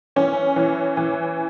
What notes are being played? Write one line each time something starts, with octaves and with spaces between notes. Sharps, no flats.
E3 C#4
E3
E3